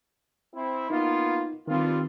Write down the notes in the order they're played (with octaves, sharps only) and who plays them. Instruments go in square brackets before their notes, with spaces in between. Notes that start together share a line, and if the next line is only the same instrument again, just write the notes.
[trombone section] C4 E4
[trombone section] A#3 B3 F4 [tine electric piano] D#4
[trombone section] G2 F4 [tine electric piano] D#3 C4